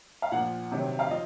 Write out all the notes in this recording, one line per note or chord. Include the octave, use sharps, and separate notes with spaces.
F5
A#2 F3 F#5
C3 D#3 F#3
F5
F3 D#5